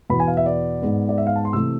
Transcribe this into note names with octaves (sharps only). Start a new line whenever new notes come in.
E2 B2 B3 B5
G#5
F5
E5
D5
G#2 G#3 B3
D5
E5
F5
A5
C6
C3 E3 A3 E6